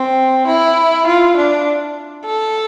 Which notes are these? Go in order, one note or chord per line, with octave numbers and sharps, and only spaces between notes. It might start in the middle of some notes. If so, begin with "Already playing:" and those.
Already playing: C4
E4
F4
D4
A4